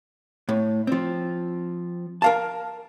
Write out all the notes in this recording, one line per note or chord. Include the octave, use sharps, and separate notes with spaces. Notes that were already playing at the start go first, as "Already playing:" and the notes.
A2
F3 C4
A#4 F5 A5